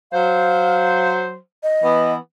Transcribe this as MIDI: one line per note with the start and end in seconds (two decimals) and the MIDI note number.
0.12 1.35 54
0.12 1.35 72
0.12 1.12 77
1.63 2.13 75
1.82 2.14 52
1.82 2.14 59